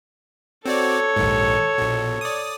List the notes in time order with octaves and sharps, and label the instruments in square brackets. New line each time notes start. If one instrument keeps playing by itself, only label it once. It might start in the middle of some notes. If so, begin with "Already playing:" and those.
[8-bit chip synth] C4 F#4 D5 [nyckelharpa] A4 C#5
[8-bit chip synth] A#1 D#2 G#2
A#1 B2
D5 D#6